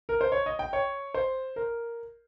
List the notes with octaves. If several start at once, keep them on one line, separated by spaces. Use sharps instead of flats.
A#4
C5
C#5
D#5
G5
C#5
C5
A#4